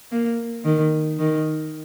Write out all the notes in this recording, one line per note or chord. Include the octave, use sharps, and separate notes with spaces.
A#3
D#3
D#3